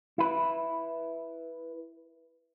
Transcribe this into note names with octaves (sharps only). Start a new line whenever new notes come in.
E4 B4